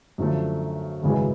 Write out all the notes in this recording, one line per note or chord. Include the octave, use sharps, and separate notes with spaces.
F#2 D3 F3 A3
G#1 F#2 C#3 E3 G#3